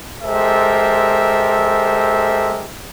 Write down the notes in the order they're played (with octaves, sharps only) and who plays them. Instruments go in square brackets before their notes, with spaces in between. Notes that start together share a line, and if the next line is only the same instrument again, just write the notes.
[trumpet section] G#3 G4 A4 A#4 C5 E5